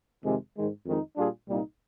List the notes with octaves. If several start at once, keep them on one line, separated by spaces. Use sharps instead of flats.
F2 C3 D#3 G#3
G#2 D#3 G#3
F2 D#3 G#3 D#4
A#2 G3 D4 F4 G#4
C2 A#2 G3 A#3 D#4